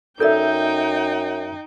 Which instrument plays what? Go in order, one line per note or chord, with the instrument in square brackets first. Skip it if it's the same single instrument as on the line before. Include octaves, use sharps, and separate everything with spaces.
[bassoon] F#2 [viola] D#4 G5 [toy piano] A4 A#4 D5 [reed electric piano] E5 G6